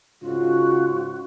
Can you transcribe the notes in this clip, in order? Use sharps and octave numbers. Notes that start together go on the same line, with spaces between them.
G#2 C#3 F4 F#4